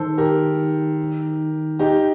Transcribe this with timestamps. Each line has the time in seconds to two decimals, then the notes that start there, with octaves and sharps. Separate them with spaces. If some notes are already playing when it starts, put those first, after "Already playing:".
Already playing: D#3 A4 C5
0.18 G4 A#4
1.79 D#4 G4